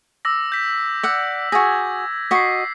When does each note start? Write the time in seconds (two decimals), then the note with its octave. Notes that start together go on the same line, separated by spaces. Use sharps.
0.25 D6 E6 A#6
0.52 G6 B6
1.03 D5 F#5 E6
1.52 F#4 G#4 G#6 A#6
2.31 F#4 D#5 B6 C7